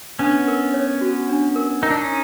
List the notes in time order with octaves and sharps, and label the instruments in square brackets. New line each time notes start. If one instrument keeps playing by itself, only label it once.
[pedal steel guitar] B3 C#4 [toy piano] D4
[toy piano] A#4
C#5
F#4
D4
A#4
[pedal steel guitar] D#4 [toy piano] A#4
[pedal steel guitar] D4
C#4 D#4